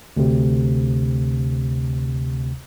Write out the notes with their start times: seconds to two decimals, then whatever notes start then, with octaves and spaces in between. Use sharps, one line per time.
0.17 D2 C3